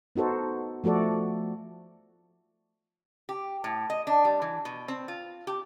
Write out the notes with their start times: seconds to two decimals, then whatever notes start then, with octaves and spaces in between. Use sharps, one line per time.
0.16 B3 D#4 F#4 A4 C5
0.84 F3 A3 F#4 A4 D5
3.29 G4
3.64 A2
3.90 D#5
4.07 D4
4.25 G3
4.42 E3
4.65 B2
4.88 C4
5.08 F4
5.47 G4